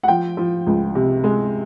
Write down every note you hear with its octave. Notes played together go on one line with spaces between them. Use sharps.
F#5
F3 G5
F3
C#2
C3
G#3